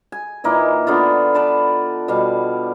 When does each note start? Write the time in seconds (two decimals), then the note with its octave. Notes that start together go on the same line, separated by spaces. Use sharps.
0.12 G#5
0.44 A#2 E3 A#3 D#4
0.87 D3 B3 F4
1.34 B4 D5 A5 B5
2.08 B2 G3 F5